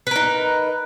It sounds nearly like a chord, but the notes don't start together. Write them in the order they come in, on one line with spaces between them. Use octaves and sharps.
B4 A#4 D#4